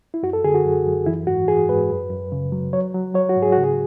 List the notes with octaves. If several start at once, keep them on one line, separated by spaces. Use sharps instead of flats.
E4
F#2 F#4
A4
D3 G#4
F#4
F#2
F#2
E3 E4
G#2 F#4
E3 G#4
G#2 B4
F#2
F#2
C#3
F#3
F#3 C#5
F#3
F#3 C#5
F#4
G#2
G#4
C#3 F#4
G#4